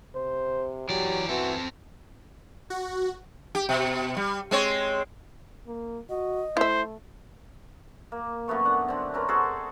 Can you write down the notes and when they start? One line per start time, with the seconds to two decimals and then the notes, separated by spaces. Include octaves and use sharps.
0.15 C3 C5
0.89 E3 F#3 G4 D5
1.29 E3 C4 F#4 A4
2.70 F#4
3.55 G4
3.69 B2
4.17 G3
4.51 G#3 C4 C#5
5.67 A#3
6.09 F#4 D#5
6.57 A3 E4 C5 E5
8.12 A#3
8.48 F#2 A3 B3 C#6
8.65 D4 F#5
8.88 D3 C4
9.14 C4 C#4 A#4 B4
9.28 F#4 G#4 A4 C5